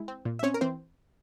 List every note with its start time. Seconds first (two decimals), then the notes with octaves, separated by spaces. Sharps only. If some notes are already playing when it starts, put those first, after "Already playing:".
Already playing: G#3 E4
0.08 C4
0.25 A#2
0.39 E5
0.43 C4 C#4 C#5
0.54 A#4
0.61 E3 C4 C5